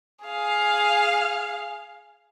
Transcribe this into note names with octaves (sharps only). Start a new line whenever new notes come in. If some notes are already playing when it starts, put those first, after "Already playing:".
G#4 F5